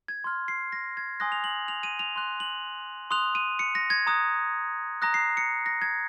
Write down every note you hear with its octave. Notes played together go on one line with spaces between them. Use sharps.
G#6
C6 F6
C7
A#6
G#6
G#5 C6 D#6 F#6 A#6
F7
F#7
F7
D#7
F7
C6 F#6
F#7
C6 D#6 F#6 F7
D#7
C#7
A#6
G#6
A#5 D#6 F#6
A#5 D#6 F#6 A#6
C7
C#7
A#6
G#6